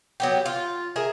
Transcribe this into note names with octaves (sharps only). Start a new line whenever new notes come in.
F#3 B3 G4
F4
G#4 A#4 E5